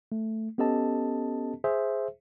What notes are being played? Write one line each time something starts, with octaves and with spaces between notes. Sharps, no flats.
A3
B3 C#4 G4 A4 D#5 A5
G#4 C5 E5